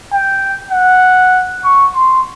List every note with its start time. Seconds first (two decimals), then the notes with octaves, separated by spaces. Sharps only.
0.14 G5
0.71 F#5
1.64 C#6
1.95 C6